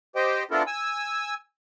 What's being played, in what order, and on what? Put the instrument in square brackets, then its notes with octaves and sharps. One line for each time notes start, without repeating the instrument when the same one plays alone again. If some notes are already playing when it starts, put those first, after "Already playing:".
[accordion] G4 C5 D#5 G5
B3 D4 E4 F4 A4 A#4
G#5 E6